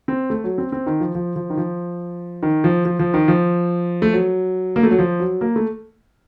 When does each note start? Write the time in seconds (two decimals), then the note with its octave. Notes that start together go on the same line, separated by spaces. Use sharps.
0.08 C4
0.30 A3
0.44 F#3
0.58 C4
0.72 C4
0.87 D#3
1.00 F3
1.15 F3
1.36 F3
1.50 D#3
1.57 F3
2.43 D#3
2.64 F3
2.85 F3
2.99 F3
3.14 D#3
3.28 F3
4.02 A3
4.13 F#3
4.76 A#3
4.83 A3
4.91 F#3
4.99 F3
5.20 F#3
5.41 A#3
5.56 A3